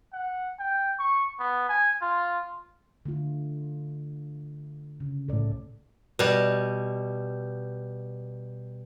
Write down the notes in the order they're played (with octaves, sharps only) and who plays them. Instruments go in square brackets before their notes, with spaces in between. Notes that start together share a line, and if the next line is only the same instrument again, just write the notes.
[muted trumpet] F#5
G5
C#6
B3
G#5
F4
[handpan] D3 A3 F4
C#3
[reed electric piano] C2 A2 [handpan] A4 D5
[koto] B2 G3